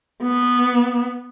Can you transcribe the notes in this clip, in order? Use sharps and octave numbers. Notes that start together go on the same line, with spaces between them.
B3